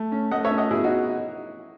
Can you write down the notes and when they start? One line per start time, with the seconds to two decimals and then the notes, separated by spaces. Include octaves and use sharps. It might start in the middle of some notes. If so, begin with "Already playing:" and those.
Already playing: A3
0.12 C#4
0.31 A3 D#5 F#5
0.45 C#5 E5
0.51 C#4
0.58 D#5 F#5
0.71 B2 E4 G#4
0.84 D#4 F#4